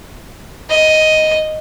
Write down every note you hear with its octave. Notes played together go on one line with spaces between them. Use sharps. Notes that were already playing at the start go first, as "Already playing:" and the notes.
D#5